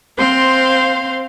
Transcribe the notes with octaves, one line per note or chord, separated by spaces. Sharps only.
C4 C5 F5 C6